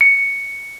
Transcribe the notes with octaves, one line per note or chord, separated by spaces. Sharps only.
C#7